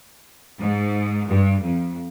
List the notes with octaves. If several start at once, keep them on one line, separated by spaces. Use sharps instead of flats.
G#2
G2
F2